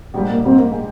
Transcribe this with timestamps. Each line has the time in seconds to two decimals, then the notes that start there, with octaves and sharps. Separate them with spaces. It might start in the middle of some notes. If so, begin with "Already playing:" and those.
0.14 A#1 G#2 G3 G#3
0.29 A#3
0.45 A#1 G#2 G3 C4
0.58 A#3
0.72 G#3